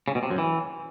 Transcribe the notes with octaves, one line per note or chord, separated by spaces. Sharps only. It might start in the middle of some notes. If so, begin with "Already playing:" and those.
C#3
B2
C3
F#2
E3